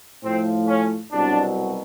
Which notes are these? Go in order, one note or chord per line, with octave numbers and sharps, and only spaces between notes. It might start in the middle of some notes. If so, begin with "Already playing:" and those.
A2 F3 A3 C4
C#4
C2 B2 F#3 D4